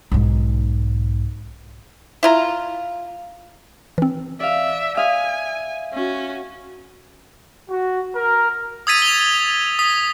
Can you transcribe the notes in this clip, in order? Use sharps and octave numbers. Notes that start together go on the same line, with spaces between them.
B1 G#2
E4 F4 A#5
E3 C4
D5 E5 F5
E5 F5 G#5 D#6
C#4 F#4
F#4
A#4
D#6 E6 G#6 A6 B6 D#7
F7 G7
D#6 B6